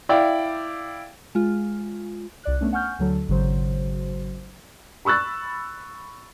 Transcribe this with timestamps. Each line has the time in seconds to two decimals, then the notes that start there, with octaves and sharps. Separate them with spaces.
0.09 E4 D5 F5 G5
1.35 G#3 F4
2.44 C2 D5 F#6
2.61 A3 B3 C#4 D4
2.73 F#5 G#5 C#6 F6 G6
2.99 D2 D3 F#3 A4
3.28 G#1 C#3 F#3 C5
5.05 B5 C#6 E6 F#6 A6